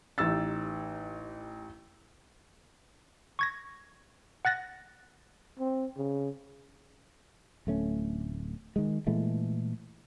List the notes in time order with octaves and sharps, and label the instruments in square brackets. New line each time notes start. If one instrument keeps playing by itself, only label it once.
[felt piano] A1 D#4 G4 E6 A6
[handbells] C#6 G#6 A#6
F#5 F#6 A6 A#6
[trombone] C4
C#3
[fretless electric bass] D1 A3 C#4
D#3 G#3
A#2 E3 G#3 A3